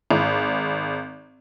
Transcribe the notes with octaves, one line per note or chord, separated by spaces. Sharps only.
G#1